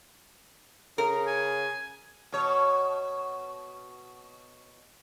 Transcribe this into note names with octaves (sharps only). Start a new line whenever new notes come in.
C#3 A#4
G#5
B2 C#5